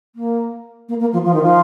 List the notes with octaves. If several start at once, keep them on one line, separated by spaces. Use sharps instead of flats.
A#3
A#3
A#3
F3
F3
D#3
F3